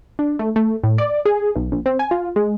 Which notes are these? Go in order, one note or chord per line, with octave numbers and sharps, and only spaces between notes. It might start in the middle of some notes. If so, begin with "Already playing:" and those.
D4
A3
A3
A2
D5
G#4
B1
A#1
C4
G#5
F4
G#3